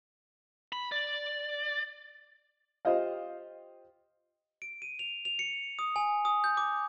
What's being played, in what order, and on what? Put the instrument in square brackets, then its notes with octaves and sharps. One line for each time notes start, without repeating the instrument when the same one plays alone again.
[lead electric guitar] B5
D5
[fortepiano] F4 G4 C5 D#5 F5
[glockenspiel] D7
D#7
F7
F7
C#7
D#6
G#5
D#6
G6
D6